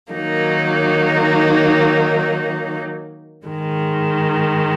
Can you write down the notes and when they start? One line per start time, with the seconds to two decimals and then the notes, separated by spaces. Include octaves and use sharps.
0.12 D#3 F#3 A#3 D#4
3.46 G#2 D#3 G#3